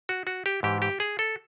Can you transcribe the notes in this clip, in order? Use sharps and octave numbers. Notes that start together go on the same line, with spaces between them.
F#4
F#4
G4
G#2 E3 G4
G4
G#4
A4